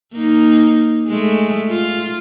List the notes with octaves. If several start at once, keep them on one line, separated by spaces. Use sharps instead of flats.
A#3 D#4
G#3 A3
F4